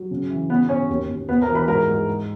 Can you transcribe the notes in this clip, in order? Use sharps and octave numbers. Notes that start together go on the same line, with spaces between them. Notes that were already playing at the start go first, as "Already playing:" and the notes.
Already playing: F#3
C#3
E3
C#3 B3 B4
C#3 C#4 C#5
D#2
D#2
D#2 B3 B4
A#4 A#5
E3
B4 B5
G#2 A#4 A#5
G#2
G#2